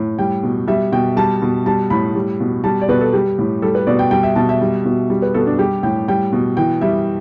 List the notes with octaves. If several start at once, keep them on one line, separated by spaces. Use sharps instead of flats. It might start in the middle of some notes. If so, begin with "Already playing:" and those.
Already playing: A2
G3 G5
B2
G3 E5
B2 G5
G3 A5
B2
G3 A5
A2 B5
G3
B2
G3 A5
D5
B2 B4
A4
G3 G4
A2
G3 A4
B4
B2 D5
G5
G3 G5
E5
B2 A5
E5
G3
B2
G3
B4
B2 A4
D4
G3 G4
A2 G5
G3 G5
B2
E3 G5
G3 E5